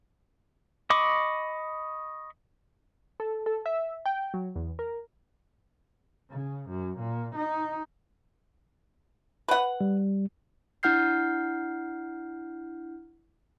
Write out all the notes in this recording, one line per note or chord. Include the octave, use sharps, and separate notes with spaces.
D#5 B5 C#6 D6
A4
A4
E5
G5
F#3
E2
A#4
C#3
F#2
A#2
D#4
B4 F#5
G3
D4 E4 F#5 F6 G6 C7